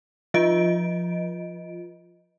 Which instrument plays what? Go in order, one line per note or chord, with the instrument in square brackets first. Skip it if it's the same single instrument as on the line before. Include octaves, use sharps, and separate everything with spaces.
[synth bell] F3 F4 D#5 D7